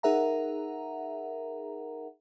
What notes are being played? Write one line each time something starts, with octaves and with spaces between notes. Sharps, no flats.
D#4 G#4 A#4 E5 F#5 A#5